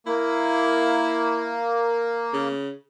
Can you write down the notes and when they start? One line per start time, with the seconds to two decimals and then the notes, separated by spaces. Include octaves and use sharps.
0.07 A#3 E4
2.33 C#3